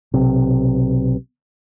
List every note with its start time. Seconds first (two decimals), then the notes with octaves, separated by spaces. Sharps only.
0.14 B1 C3